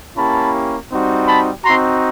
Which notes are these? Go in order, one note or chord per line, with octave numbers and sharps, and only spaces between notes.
A#3 C#4 E4 G4 A5 B5
G3 C4 D#4 F#4
A5 B5
C4 D#4 F#4 A#5 C6